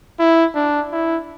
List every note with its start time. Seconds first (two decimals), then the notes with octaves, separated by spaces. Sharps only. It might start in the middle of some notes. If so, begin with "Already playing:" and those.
0.19 E4
0.55 D4
0.92 E4